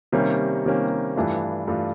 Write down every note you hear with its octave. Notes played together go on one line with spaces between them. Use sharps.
C3 D#3 G3 A#3 C#4
C3 D#3 G3 A#3 C#4
G2 E3 A3 D4 F4
G2 E3 A3 D4 F4